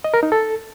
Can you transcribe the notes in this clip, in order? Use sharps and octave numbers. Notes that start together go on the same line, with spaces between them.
D#5
A#4
D#4
A4